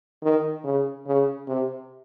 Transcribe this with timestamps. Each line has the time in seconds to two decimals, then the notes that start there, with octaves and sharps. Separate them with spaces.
0.23 D#3
0.65 C#3
1.07 C#3
1.48 C3